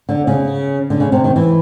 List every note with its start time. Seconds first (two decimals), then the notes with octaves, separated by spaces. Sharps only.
0.09 D3
0.27 C#3
0.90 D3
1.00 C#3
1.12 C3
1.24 D#3
1.36 E3